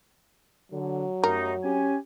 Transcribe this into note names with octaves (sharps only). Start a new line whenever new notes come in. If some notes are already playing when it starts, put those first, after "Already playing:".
D3 F#3
F#2 G3 A3 D#4 A#4
C#4 G4 G#5